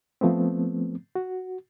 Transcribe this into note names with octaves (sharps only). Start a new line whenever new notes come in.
F3 A3 B3 C4
F#4